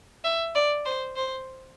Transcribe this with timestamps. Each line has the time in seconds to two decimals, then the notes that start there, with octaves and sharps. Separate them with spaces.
0.24 E5
0.55 D5
0.85 C5
1.16 C5